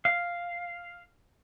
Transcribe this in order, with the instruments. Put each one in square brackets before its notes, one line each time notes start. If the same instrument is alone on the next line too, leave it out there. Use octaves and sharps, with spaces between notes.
[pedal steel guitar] F5